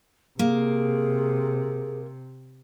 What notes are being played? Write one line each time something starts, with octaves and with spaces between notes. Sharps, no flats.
C3 A#3 G#4